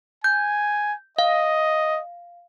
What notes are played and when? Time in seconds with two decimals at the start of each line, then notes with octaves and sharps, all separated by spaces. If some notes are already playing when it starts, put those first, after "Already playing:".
0.24 G#5 G6
1.19 D#5 F5